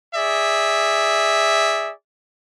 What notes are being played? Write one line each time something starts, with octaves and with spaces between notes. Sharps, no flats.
G#4 D5 E5